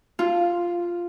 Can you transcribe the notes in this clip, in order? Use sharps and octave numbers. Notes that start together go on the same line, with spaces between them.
F4